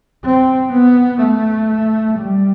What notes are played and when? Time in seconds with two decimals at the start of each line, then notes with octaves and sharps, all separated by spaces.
0.24 C4
0.73 B3
1.21 A3
2.19 G3